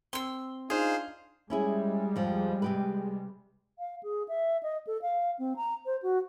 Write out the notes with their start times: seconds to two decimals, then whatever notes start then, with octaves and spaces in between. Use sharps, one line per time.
0.13 C4 C6 E6
0.70 D4 D#4 F4 G#4 C5 F5
1.50 G3 G#3 C#4 E4 G#4
2.16 F2 F3
2.62 C3 G4 B4
3.79 F5
4.03 G#4
4.28 E5
4.63 D#5
4.87 A4
5.02 F5
5.39 C4
5.56 A#5
5.85 C5
6.02 F#4